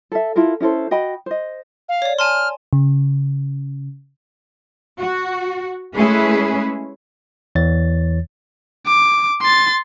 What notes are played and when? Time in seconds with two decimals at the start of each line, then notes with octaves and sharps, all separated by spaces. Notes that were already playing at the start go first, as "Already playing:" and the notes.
0.12 A4 E5
0.36 E4 F4 A4 A#4
0.60 C#4 E4 A4 C5
0.91 F#4 D#5 G5 B5
1.26 C5 D#5
1.89 F5
2.02 C#5 D5
2.19 G#5 A5 C6 F6
2.73 C#3
4.99 F#4
5.95 G#3 A3 C#4 E4 G#4 B4
7.55 E2 E3 C#5 A6
8.86 D6
9.41 C6 A6